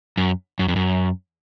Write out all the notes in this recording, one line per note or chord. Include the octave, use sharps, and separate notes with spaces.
F#2
F#2
F2
F#2